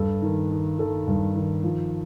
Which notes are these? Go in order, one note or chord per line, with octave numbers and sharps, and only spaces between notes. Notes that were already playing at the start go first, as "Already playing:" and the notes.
Already playing: G2 A4
D#3
D#3
D#3 A4
G2
D#3
F3